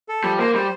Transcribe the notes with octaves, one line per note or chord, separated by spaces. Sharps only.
A4
F3 G3
A#3 C5
G3 C5